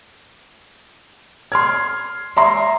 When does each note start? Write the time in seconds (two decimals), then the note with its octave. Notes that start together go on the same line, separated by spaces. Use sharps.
1.52 C6 F6 G#6
2.37 E5 A#5 C6